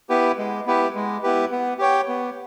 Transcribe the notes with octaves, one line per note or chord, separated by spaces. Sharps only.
B3 E4 G4 B4
G#3
B3 E4 G4 B4
G#3
B3 E4 G4 B4
B3
G4 C#5 G5
B3